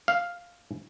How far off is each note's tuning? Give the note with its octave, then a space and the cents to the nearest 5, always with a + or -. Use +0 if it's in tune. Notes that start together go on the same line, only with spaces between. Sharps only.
F5 +5